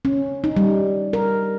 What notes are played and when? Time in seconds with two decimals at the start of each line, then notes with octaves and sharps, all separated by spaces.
0.05 C#4
0.44 D#4
0.57 G3
1.13 A#4